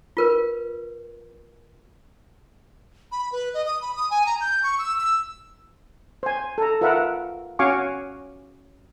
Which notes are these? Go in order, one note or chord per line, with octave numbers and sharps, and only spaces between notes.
F4 A#4 B4
B5
B4
D#5
D#6
B5
D#6
G#5
A#5
G6
C#6
E6
E6
C5 G#5
A4 A#5
F4 A#4 B4 E5 F#5
C#4 F#4 F5 G#5 C#6 D6